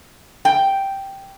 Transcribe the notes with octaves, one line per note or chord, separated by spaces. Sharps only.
G5